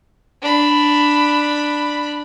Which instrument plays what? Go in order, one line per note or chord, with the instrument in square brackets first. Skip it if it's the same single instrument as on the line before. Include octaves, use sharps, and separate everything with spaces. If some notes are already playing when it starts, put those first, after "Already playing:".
[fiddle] D4 B5